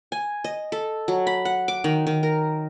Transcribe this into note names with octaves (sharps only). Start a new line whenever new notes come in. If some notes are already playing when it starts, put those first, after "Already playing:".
G#5
D#5
A4
F#3
B5
F#5
D6
D#3
D#3
A#4